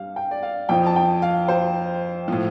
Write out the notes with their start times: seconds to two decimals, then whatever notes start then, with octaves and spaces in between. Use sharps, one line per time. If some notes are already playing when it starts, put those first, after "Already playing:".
Already playing: G2 G3 F5
0.16 G5
0.31 D5
0.43 F5
0.69 F2 F3 G5
0.86 A5
0.96 G5
1.22 F5
1.48 C5
2.28 A2 F3